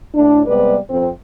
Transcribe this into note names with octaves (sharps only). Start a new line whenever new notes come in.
A2 D4
C3 G3 G#3 B3 B4 D5
F2 C4